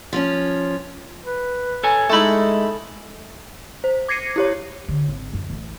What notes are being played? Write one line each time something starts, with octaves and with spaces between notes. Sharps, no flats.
F3 C#4
B4
A4 C#5 G#5
G#3 A3 D#4 E4 A4 B5
C5
D6 G#6 A#6 C7 C#7 D#7
E4 G4 C#5
D3
G#1
F#2
A1